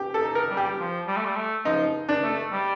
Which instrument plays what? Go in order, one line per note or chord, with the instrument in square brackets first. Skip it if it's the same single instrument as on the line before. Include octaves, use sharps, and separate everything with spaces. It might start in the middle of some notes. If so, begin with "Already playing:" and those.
Already playing: [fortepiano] G4
A4
[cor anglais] D#4
[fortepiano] A#4
[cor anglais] G3
[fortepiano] G4
[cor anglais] F3
G3
A3
G3
A3
[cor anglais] F3 [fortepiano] D#4
[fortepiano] D4
[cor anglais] A3
G3